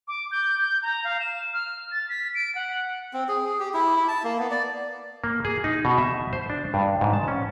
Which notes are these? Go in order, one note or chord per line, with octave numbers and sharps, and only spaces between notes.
D6
G6
G6
A#5
F5
E7
F6
A6
B6
D7
F#5
C4
G#4
G#4
G4
E4
E4
A5
A#3
B3
D5
A#3
G#4
D#4
B2
E5
C5
D4
G2
G#2
A5
C#4